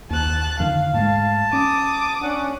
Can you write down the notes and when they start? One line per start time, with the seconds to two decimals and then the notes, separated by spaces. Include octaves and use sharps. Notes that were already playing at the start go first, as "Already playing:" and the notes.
0.10 D#2 A5 F#6
0.60 F2 D3 D#3 F5
0.94 G#2 G#3 A3 A5
1.53 C#4 D6 D#6
2.22 C#4 D4 F#5